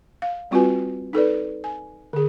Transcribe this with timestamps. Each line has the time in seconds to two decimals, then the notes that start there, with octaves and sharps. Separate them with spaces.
0.22 F5
0.51 G3 C4 F4 F#4 B4 G#5
1.13 D#4 A4 B4 D5
1.64 G#5
2.13 D3 G#4